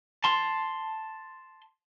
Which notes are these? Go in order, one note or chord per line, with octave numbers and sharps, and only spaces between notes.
A5 C6